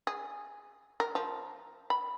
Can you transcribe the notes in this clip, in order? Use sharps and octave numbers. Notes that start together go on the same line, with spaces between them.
G#4
A#4
F3
B5